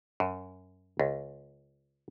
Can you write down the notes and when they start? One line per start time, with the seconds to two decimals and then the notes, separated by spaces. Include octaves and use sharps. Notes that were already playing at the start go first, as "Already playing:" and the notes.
0.20 F#2
0.99 C#2